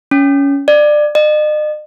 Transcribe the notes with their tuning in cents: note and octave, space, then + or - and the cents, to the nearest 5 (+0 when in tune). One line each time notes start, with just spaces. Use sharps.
C#4 +15
D5 +20
D#5 -40